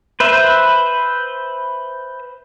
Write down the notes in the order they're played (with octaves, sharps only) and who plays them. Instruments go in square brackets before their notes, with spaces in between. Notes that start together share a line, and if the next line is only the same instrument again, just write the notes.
[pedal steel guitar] B4 C5 E5